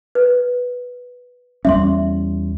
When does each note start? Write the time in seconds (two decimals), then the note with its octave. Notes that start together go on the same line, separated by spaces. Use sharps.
0.15 B4
1.65 E2 G3 C#4 E5 C6